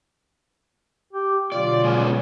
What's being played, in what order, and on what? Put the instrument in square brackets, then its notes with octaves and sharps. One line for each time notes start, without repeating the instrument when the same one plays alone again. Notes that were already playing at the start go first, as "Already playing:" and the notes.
[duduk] G4
[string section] B2 D3 F#3 [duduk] F4 [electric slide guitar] D5
[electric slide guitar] G#3 B3 C#4